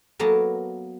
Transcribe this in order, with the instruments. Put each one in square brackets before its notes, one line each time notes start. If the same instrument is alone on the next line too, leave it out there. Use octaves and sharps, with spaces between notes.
[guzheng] F#3 A#3 B3 A4 A#4